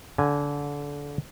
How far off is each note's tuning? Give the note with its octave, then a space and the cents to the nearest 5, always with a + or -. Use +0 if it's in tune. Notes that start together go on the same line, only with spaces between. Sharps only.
D3 -25 G#5 -5